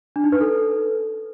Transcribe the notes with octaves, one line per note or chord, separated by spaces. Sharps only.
D4
D#4
B4
A4